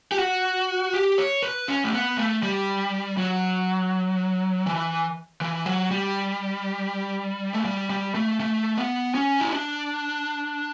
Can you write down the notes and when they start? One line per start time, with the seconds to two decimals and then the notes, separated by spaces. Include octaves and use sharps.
0.12 G4
0.19 F#4
0.94 G4
1.18 C#5
1.42 B4
1.68 C#4
1.84 A3
1.93 B3
2.18 A3
2.43 G3
3.17 F#3
4.66 E3
5.41 E3
5.66 F#3
5.91 G3
7.54 A3
7.65 G3
7.90 G3
8.15 A3
8.40 A3
8.78 B3
9.15 C#4
9.40 E4
9.52 D4